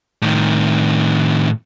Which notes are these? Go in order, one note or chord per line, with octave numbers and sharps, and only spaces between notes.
A2 D#3